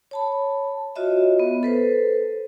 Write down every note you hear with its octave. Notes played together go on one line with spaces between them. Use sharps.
C#5 A5 B5
F4 F#4 C#5 D#5 E5
B3
A4 B4 C5